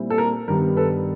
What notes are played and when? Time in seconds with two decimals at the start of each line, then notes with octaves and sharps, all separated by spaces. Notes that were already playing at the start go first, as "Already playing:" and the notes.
Already playing: A#2 G3 C4 E4
0.10 A4
0.18 A#4
0.48 G2 D#3 G3 B3 A#4
0.77 A4 B4